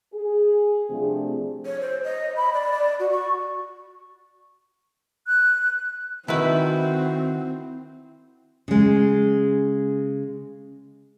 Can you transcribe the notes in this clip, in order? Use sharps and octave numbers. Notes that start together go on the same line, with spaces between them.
G#4
C3 F3 G3 A3 C4 D4
C#5
C5
D#5
B5
D5
D5
F#4
C#6
F#6
D#3 C4 E4 F#4 B4
C#3 G#3